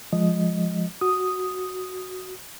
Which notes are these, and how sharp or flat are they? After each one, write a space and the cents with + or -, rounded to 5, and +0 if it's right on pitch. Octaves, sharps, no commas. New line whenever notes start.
F3 +0 G#3 +0 D#5 +0
F#4 +0 D#6 +0